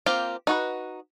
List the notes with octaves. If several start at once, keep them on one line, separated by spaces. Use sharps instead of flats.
A#3 C4 F4 G4 F5
D#4 F#4 B4